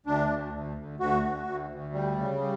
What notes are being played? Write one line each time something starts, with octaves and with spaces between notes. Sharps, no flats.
D2 D4
D2
D2
D2
D2 F#4
D2
D2
D2
G3
C#3
G3